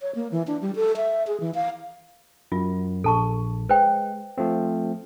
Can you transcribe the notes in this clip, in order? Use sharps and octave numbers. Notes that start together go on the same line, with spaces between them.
C#5
A#3
E3
D4
G3
A4
E5
G#4
E3
F5
F#2 F4
A#1 A4 A5 C#6
G#3 B4 C5 G5
F3 A3 C4